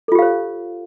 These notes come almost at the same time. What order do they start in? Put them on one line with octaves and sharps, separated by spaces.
A4 F4 G4 F5 C5